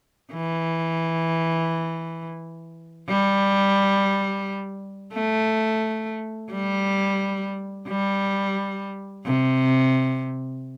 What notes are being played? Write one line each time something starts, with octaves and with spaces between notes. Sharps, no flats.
E3
G3
A3
G3
G3
C3